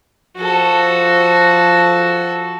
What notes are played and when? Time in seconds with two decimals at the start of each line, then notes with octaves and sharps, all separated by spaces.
0.37 F3 F#4 A4